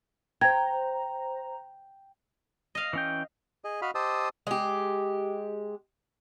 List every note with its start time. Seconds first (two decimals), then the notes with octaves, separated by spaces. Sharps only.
0.41 C5 G5 A#5 G#6
2.75 D#5 F5
2.93 E3 C#4 G5
3.64 G#4 D#5
3.82 F#4 D#5 F5 B5
3.95 G4 C5 D#5 A5 D#6 E6
4.47 G#3 G4